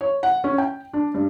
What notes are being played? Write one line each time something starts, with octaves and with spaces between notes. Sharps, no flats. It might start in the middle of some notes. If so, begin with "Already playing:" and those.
C#5
F#5
C#4
G5
D4
G2